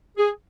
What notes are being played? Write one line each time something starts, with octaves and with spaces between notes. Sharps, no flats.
G#4